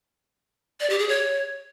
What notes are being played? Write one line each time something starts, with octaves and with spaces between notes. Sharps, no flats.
D5
G4
G#4
C#5